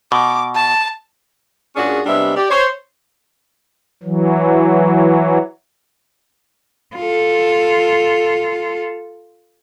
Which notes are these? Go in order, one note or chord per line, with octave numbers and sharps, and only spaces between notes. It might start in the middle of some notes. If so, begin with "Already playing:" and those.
B2 D6
A5
A#2 C#4 D4 F#4 G#4
C3 G3 G#3 B3 D4 E5
G4 D5
C5 C#5
E3 F#3
F4 A4